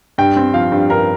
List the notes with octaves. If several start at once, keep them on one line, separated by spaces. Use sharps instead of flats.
G2 G5
C4
F3 F5
G2
G2 A#4